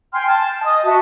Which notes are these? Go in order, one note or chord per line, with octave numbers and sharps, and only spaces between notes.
G5 G#5 C6 F6
A5
D#5 D#6
F#4 D#5 E5 A5